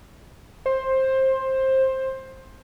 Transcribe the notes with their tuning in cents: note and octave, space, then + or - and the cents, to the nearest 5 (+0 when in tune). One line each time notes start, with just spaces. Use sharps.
C5 +15